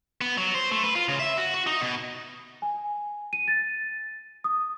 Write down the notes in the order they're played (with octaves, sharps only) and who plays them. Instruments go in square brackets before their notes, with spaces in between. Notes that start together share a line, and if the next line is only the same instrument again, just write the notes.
[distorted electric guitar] B3
F#3
C5
A3
B4
F4
C#3
E5
F#4
F#4
D#4
B2
[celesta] G#5
D#7
A6
D#6